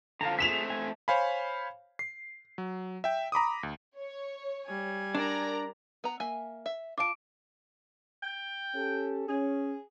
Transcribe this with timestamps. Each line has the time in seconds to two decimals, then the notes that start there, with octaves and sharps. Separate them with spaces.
0.21 D3 F3 F5 A5 A#5
0.39 A3 C4 G#4 B6 E7 F7
0.70 G#5
1.08 C5 C#5 F5 G#5 B5
1.99 C7
2.58 F#3
3.04 E5 G5
3.32 A#5 B5 D6 D#6
3.63 D2
3.96 C#5
4.67 G3 G#5
5.15 D4 A#4 D5 A#5
6.04 B3 A#5
6.20 A#3 E5 G#5
6.66 E5
6.98 F4 F5 A5 D6 D7
8.22 G5
8.75 C#4 G4 A4
9.28 C#4 G#4